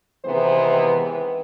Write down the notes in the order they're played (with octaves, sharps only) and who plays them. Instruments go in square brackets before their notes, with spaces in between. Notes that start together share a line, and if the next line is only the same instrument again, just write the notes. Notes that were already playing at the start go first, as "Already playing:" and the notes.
[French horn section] C3 D#3 E3 G#3 B3 C5